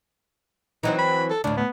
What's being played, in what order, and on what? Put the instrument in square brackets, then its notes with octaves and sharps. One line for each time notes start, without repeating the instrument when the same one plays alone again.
[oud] E3 F#3 C4 [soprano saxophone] D#4
[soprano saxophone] B5
A4
[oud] D2 A2 [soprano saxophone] D4
[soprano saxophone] B3